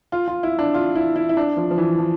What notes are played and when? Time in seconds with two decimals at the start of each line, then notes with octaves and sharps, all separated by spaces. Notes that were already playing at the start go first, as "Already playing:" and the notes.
0.12 F4
0.28 F4
0.43 E4
0.59 D4
0.74 F4
0.95 E4
1.16 E4
1.29 E4
1.37 D4
1.57 F3
1.71 F3
1.78 E3
1.98 F3